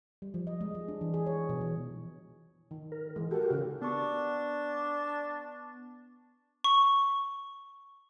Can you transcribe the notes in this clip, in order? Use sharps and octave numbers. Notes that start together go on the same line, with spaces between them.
G3
F3
D#5
G#3
G#3
D4
E3
G#4
C#5
B2
E3
D#3
A#4
E3 G#3
F#4 G4 A4 A#4
C#3
B3 D4 C#6
C#6